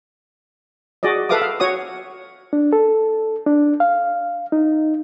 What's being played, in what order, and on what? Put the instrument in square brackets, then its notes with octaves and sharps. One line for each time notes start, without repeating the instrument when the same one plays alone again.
[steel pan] F#4 G#4 D5 D#5
A4 B4 E5 F5 D6 D#6
F5
F#4 C#5 F#5 D#6
[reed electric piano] D4
A4
D4
F5
D#4